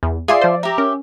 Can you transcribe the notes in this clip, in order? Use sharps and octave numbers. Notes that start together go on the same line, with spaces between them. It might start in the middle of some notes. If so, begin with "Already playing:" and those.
E2
F4 G#4 D5 E5 C6
F3 C5
G4 E5 A#5
C#4 A#4